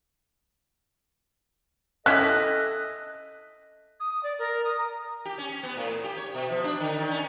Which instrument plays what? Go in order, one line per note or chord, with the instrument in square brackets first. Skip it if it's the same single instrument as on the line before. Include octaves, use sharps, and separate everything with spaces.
[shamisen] C#4 E4 G4 [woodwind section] A4 D#5 [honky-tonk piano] F#6 B6
[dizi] D#6
D5
A#4
D#6
A#5
[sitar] G4
C#4
B3
A2
G4
C#5
B2
F3
D4
D3
D#3
C#4